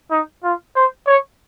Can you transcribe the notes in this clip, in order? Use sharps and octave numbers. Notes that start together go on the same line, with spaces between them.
D#4
F4
C5
C#5